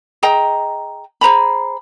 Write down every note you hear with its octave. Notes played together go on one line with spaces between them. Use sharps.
G#4 D#5 G5 A#5
G#4 C5 A#5 B5